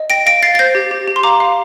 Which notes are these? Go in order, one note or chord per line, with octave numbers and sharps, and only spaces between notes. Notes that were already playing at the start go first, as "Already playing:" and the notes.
Already playing: D#5
G5 A#6 D7
F5 A#6 D7
F5 A6 C7
A6
C5 G6 A#6
G4
G4
G4
C6
F5 A#5 D6
F5